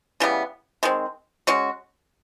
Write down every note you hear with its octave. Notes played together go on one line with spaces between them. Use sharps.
C#3 E3 G3 B3
D#3 G#3 C4
G#3 C#4 F#4